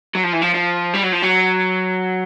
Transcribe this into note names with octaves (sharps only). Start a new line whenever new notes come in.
F#3
F3
E3
F3
F3
G3
F#3
F3
F#3